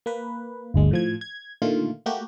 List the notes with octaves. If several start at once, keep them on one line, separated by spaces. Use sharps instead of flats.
A#3 B4
G1 D2 G#3
A2 F3 G#6
G#6
A#2 D3 D#3 A3 F4
A3 A#3 F#4 G4